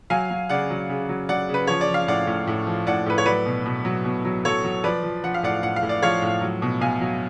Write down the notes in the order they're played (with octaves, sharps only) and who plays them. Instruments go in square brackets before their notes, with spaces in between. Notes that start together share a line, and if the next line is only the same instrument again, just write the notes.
[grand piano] F#3 F5 G#5
F#3
C#3 D5 F#5
F#3
C#3
F#3
F#3 D5 F#5
C#3
B4
F3 C#5
D5
F3
F5
A2 D5 F#5
A2
A2
F3
A2 D5 F#5
A2 B4
C#5
F#3 B4 D5
B2
B2
F#3
B2
F#3
F#3 A4 C#5
F#3
F3 B4 D5
F3
F3 F#5
F5
A2 D5 F#5
A2 F#5
F5
A2
D5
F3 C#5 F5
A2
F#3
B2
B2 F5 G#5
F#3